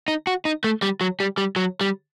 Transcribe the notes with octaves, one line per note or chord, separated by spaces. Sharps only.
D#4
F#4
D#4
A3
G3
F#3
G3
G3
F#3
G3